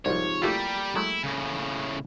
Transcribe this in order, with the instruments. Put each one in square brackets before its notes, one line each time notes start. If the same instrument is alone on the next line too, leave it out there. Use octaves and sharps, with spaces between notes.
[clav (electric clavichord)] C2 [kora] G#2 C3 F3 [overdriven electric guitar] C#5
[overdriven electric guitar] G3 [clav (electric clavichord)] A3 E4 F4 [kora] A#3 G4 A4
[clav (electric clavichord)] F#3 G#3 A3 [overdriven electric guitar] E4
[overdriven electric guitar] A2 C#3